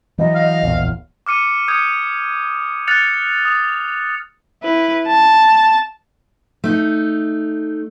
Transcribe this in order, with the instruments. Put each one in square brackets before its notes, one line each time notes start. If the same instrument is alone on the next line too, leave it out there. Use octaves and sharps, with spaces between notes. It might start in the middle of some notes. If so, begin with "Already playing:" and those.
[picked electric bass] E3 F#3 [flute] D#5
[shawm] F5
[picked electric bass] D1 A#1 E2
[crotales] D6 F6 C#7 D#7
D#6 G6 G#6 C#7
F6 F#6 A6 C#7 F7
D#6
[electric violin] E4 B4
A5
[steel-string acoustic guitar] A3 D#4